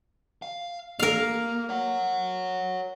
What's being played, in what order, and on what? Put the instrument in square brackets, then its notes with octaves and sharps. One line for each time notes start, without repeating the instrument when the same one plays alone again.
[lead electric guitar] F5
[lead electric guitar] A#3 [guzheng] A#4 F5
[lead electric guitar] C#5 F#5